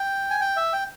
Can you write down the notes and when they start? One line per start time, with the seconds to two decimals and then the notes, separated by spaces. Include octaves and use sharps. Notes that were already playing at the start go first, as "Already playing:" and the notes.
Already playing: G5
0.30 G#5
0.41 G5
0.57 E5
0.73 G5